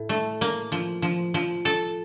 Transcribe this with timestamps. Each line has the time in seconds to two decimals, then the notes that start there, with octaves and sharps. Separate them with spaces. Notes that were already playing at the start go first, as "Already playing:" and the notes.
Already playing: A2
0.09 A3
0.41 A#3
0.72 F3
1.02 F3
1.34 F3
1.65 A4